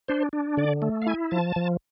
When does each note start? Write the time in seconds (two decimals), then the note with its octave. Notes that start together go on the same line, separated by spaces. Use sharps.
0.08 D4 C5
0.33 D4
0.57 D3 D5
0.82 A3
1.02 F5
1.07 E4 G#5
1.31 F3 A5
1.56 F3